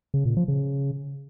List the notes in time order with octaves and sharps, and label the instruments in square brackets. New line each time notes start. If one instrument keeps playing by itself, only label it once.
[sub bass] C#3
A#2
F3
C#3